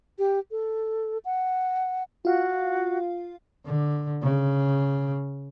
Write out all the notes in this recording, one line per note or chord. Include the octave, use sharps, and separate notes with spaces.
G4
A4
F#5
F4 F#4 F5
D3
C#3